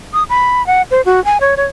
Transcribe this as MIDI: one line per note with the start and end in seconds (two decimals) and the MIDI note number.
0.13 0.23 87
0.30 0.65 83
0.67 0.82 78
0.91 1.01 72
1.05 1.23 66
1.25 1.38 80
1.41 1.55 73
1.57 1.65 73